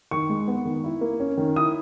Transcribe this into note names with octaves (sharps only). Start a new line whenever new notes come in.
D#3 C#6
G#3
B3
D#3
E4
A#3
C#4
D#3
E4 D#6